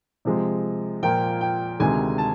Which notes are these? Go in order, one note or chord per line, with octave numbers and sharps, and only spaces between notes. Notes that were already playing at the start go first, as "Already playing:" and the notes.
C3 F3 G#3
A#2 F3 A#3 G5
G5
D2 C3 D#3 G#3 G#5
A5